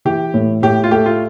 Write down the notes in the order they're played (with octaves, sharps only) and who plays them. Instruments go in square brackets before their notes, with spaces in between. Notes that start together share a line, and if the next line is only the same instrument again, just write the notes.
[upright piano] E3 [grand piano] G4
[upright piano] A2
[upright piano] A2 [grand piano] G4
[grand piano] F4
[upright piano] A3 [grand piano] G4
[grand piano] F4